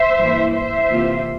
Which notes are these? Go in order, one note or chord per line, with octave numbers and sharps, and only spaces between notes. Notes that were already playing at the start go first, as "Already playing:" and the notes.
Already playing: C5 E5
G2 E3 A#3 E4
C5 E5
C3 E3 A#3 F4